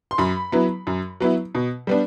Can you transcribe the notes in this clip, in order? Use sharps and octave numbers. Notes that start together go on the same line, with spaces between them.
C6
F#2 B5
F#3 B3 E4
F#2
F#3 B3 E4
B2
G3 B3 D4